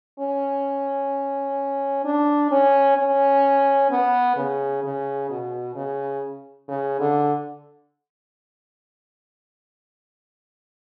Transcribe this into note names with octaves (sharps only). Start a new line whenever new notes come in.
C#4
D4
C#4
C#4
B3
C#3
C#3
B2
C#3
C#3
D3